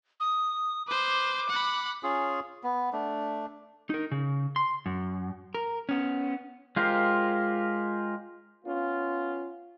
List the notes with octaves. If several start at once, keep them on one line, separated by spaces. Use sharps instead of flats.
D#6
B4 C5 D6
F#5 B5
C#4 F4 G#4
B3
A3 D4
D#4 A#4
C#3
C6
F#2
A#4
B3 C#4
G#3 F4 G4 A#4 C5
B3 C#4 F4